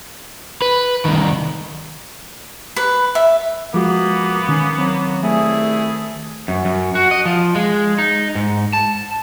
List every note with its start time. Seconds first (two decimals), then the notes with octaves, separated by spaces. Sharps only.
0.62 B4
1.06 C2 D#3
2.76 B4
3.15 E5
3.74 F3 G#3 A#3 B3 F#4 D6
4.49 D#3 C#4
4.78 F#3 C4
5.23 C2 A3 E4 G#4
6.48 F#2
6.65 F#2
6.95 F#4
7.11 D#5
7.25 F3
7.55 G#3
7.98 D#4
8.35 G#2
8.73 A5